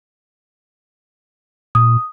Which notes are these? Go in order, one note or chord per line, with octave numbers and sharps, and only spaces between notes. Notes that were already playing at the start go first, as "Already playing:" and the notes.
A#2 D#6